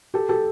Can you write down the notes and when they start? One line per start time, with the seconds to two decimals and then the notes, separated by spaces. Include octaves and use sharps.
0.14 G4 A4
0.29 G4 A4